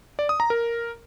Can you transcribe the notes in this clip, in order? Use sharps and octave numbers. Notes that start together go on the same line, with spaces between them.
D5
D#6
A#5
A#4